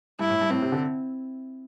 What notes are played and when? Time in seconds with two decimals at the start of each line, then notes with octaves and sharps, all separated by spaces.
0.19 G2 E4
0.30 A2
0.41 G2
0.51 A2 C4
0.62 C3
0.72 D3